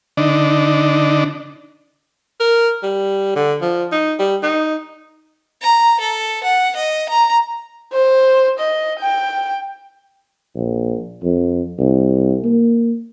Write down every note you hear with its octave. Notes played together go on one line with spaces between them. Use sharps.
D3 D4 D#4
A#4
G3
D3
F3
D#4
G3
D#4
A#5
A4
F#5
D#5
A#5
C5
D#5
G5
A#1
F2
C2
A#3